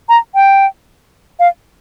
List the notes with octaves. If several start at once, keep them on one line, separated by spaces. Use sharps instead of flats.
A#5
G5
F5